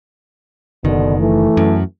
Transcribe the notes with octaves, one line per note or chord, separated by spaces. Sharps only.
F#1 B2 D3 D#3
E3 A3
F#2